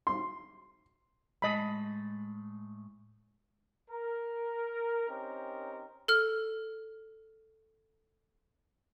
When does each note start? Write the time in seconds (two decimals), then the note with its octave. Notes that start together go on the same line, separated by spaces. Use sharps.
0.07 C6
1.42 A2 G#3 D#5 A5 B5
3.90 A#4
5.09 C4 C#4 D#4 G4 A#4
6.08 A4 F6